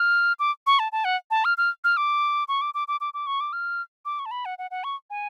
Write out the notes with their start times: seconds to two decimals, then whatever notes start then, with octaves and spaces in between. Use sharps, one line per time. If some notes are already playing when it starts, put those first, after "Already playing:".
Already playing: F6
0.40 D6
0.67 C#6
0.79 A5
0.92 A5
1.05 F#5
1.31 A5
1.45 F6
1.58 F6
1.84 F6
1.97 D6
2.48 C#6
2.61 D6
2.74 D6
2.88 D6
3.01 D6
3.14 D6
3.27 C#6
3.40 D6
3.53 F6
4.05 D6
4.19 C#6
4.26 A5
4.31 B5
4.45 F#5
4.58 F#5
4.71 F#5
4.84 C#6
5.10 G#5